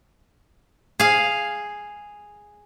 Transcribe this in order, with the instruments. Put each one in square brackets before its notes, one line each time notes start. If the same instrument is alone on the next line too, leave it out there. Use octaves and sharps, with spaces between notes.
[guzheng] G#4 F5